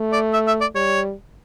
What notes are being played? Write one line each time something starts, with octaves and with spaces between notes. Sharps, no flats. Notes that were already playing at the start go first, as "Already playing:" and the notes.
Already playing: A3
D5
E5
E5
D5
G3 C#5